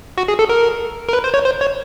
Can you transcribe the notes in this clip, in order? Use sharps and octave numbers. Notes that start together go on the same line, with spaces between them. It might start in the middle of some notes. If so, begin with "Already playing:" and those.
F#4
G#4
A4
A#4
A#4
B4
C5
C#5
C5
C#5